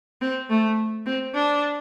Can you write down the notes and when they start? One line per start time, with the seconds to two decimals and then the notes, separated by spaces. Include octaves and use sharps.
0.21 C4
0.50 A3
1.06 C4
1.35 D4